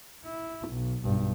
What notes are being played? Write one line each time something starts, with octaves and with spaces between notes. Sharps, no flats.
E4
B1
B1 G2